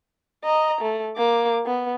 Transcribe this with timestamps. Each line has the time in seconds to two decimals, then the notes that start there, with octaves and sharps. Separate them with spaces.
0.44 D#5 A#5
0.81 A3
1.17 A#3 D6
1.66 B3